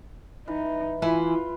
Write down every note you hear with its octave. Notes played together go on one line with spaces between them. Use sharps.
E3 D#4
E3 E4 F4 B4 G#5